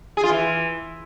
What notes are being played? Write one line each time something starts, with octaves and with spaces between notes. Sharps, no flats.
G#4
F4
E3